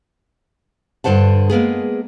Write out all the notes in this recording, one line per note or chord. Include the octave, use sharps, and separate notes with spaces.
G2 D3 C5 F#5 A5
G#3 A#3 B3 G#4